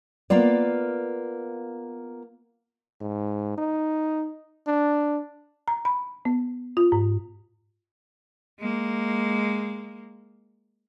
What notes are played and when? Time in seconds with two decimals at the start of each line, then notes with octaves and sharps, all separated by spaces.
0.30 A#3 B3 F4 D5
3.01 G#2
3.58 D#4
4.67 D4
5.68 A#5
5.85 B5
6.25 B3
6.77 F4
6.92 G#2
8.60 G#3 A#3